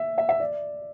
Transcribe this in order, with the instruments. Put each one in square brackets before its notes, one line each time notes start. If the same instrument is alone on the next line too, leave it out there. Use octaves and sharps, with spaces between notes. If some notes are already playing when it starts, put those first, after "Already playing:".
Already playing: [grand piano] E5
E5
E5
D5